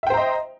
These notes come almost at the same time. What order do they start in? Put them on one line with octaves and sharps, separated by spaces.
E5 G5 C5 A#5 D#5